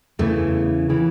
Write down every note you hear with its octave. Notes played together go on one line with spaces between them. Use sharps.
E2 C#3 E3 A3
C#3 E3